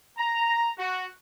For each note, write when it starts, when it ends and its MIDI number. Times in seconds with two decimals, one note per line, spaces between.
0.17 0.69 82
0.78 1.06 66